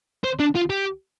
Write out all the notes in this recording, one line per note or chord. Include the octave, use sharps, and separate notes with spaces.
C5
D4
F4
G4